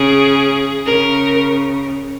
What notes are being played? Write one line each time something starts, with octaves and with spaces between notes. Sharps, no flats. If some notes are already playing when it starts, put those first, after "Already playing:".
Already playing: C#3 G#4
C#3 A#4